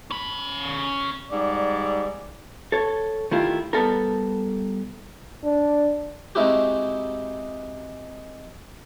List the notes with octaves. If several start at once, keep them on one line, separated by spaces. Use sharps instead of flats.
C#4 B5
G#2 G3 D5
A4 C#5
D#3 A3 E4 F4 G4
G3 B3 A4 A#4
D4
G#3 C4 D#4 E4 F#4 G4